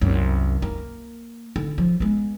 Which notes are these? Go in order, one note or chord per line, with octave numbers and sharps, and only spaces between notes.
C2 F#2
A#3
D3
F3
G#3 B3